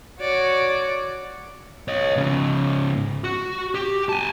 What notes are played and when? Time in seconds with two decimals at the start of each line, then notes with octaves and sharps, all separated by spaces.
0.20 F#4 C#5 D5
1.88 C#5 D#5
2.16 G#2 C#3
3.24 F#4
3.75 G4
4.09 G#5 A5